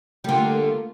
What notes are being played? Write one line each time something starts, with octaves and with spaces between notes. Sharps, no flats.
D3 G3 A3 A#3 F4